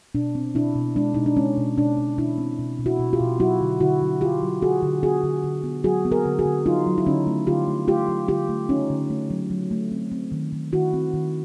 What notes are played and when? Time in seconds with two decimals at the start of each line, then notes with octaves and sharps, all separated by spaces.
0.15 B2 D4
0.35 C4
0.55 B2 D4 E4
0.76 B2
0.96 G#3 D4
1.14 B2 D#4
1.26 D4
1.37 G#3 C#4
1.57 B2
1.77 B2 D4
1.98 B2
2.18 B2 D4 E4
2.38 C4
2.59 B2
2.79 B2
2.86 E4 F#4
2.99 B2
3.13 F4 G4
3.20 B2
3.40 F#3 E4 F#4
3.61 D3
3.80 D3 E4 F#4
4.02 F#3
4.21 D3 F4 G4
4.42 F#3
4.62 D3 F#4 G#4
4.82 D3
5.03 B3 F#4 G#4
5.23 D3
5.44 D3
5.64 B3
5.84 F#3 F#4 G#4
6.05 B3
6.12 G#4 A#4
6.26 D3
6.39 F#4 G#4
6.45 D3
6.66 F#3 D#4 F4
6.87 F#3
6.98 E4
7.06 D3 C#4 D#4
7.27 A3
7.47 D3 F4 G4
7.68 A3
7.88 A3 F4 G4
8.09 F#3
8.28 D3 F4 G4
8.49 A3
8.69 D3 C#4 D#4
8.90 D3
9.10 A3
9.30 F#3
9.50 F#3
9.71 A3
9.91 C4
10.12 C4
10.32 D#3
10.52 D#3
10.73 D#3 E4 F#4
10.93 C4
11.13 D#3